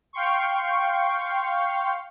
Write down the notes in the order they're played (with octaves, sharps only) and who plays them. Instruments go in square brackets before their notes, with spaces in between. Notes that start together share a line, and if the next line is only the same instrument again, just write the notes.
[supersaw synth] F5 G5 C6 C#6